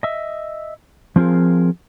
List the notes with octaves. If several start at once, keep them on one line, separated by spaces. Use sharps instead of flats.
D#5 E5
F3 C4 F4 G#4 A#4